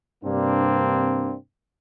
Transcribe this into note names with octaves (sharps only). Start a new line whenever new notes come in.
G2 C3 A#3 C4 D4